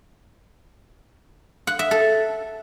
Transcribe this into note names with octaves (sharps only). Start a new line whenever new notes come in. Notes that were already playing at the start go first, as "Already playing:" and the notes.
F#5
E5
A4